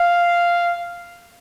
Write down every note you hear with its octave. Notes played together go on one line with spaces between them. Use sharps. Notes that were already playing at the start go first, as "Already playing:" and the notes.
Already playing: F5